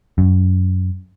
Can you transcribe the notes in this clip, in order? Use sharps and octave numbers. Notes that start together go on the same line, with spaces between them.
F#2